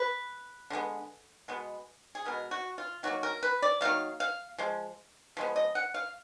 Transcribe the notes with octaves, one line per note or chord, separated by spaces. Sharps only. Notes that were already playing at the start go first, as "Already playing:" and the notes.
Already playing: B4
D3 G#3 B3
B2 G#3 B3
G#4
B2 G#3 B3 A#4
F#4
F4
D#3 F#3 A#3 F#4
A#4
B4
D5
D#3 F#3 A#3 F5
F5
F3 G#3
F3 G#3 B3
D#5
F#5
F5